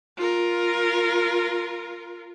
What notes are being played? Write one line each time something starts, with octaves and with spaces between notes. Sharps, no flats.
F4 A#4